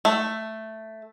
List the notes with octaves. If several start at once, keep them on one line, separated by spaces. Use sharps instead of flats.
A3